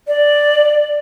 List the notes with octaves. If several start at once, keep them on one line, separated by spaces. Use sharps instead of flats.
D5